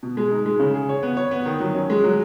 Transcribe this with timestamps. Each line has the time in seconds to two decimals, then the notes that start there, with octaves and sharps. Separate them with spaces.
0.03 B2
0.17 G#3
0.31 D#4
0.46 G#3
0.59 C#3
0.74 G#4
0.89 C#5
1.03 B3
1.17 C#5
1.31 B3
1.45 D#3
1.60 F#3
1.75 C#4
1.90 G#3
2.04 F#3